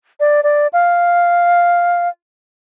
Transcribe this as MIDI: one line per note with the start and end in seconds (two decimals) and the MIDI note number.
0.20 0.41 74
0.44 0.67 74
0.73 2.09 77